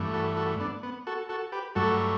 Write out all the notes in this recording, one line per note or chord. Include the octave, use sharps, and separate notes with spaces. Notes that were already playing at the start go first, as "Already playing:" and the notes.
Already playing: G2 E3 A3
F#4 A4
F#4 A4
B3 D4
B3
F#4 A4
F#4 A4
G4 B4
G2 F#3 A3 F#4 A4